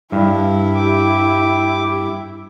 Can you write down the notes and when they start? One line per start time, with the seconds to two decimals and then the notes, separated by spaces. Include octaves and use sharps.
0.12 G2 E4
0.75 G4 D6